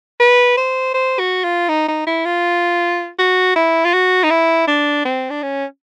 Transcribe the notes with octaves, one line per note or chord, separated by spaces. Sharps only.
B4
C5
C5
F#4
F4
D#4
D#4
E4
F4
F#4
E4
F4
F#4
D#4
E4
D4
C4
D4
C#4